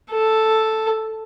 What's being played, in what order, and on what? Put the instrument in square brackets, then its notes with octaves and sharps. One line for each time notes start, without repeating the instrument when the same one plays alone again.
[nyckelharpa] A4